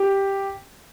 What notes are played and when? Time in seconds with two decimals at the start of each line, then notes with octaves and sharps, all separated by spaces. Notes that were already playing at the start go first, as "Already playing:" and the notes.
Already playing: G4